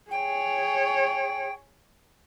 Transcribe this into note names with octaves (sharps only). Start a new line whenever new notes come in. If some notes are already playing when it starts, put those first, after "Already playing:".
G#4 C#5 G5